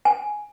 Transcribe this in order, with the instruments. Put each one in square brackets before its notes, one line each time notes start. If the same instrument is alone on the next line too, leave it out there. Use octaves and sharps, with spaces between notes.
[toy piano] G#5